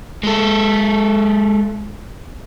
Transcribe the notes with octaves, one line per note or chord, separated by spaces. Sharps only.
G#3 A4